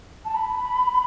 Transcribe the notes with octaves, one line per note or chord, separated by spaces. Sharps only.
A5
B5